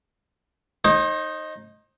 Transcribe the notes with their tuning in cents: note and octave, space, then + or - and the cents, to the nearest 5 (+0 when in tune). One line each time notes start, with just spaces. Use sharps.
D#4 +0 C5 +40